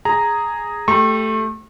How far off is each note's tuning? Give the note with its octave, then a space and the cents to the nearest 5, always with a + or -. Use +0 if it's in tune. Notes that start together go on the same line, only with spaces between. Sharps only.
G#4 +0 A#5 -5
A3 +0 G4 +0 C#6 -35